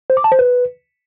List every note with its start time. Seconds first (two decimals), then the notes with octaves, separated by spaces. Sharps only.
0.10 C5
0.17 D6
0.24 A5
0.32 C5
0.39 B4